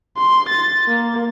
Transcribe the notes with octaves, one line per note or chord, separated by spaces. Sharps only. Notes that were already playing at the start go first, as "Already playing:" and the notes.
C6
A6
A#3